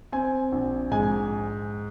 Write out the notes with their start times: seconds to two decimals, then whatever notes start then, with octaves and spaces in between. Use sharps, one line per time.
0.12 C4 G#5
0.52 A#1
0.91 G#2 G#5